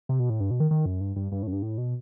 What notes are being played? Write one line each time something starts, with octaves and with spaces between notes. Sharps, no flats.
C3
B2
A2
G2
B2
D#3
D#3
F#2
G2
G2
G2
A2
F#2
G2
A2
B2